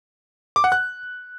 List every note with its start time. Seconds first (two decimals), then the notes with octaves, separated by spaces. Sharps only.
0.56 D6
0.64 F#5
0.72 F#6